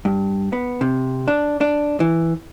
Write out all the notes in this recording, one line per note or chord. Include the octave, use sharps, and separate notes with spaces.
G2
B3
C3
D4
D4
E3